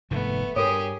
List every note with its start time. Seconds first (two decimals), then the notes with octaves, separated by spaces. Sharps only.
0.11 F1 G#2 D#3 A3 B3
0.56 G2 G4 G#4 A#4 C#5 D#6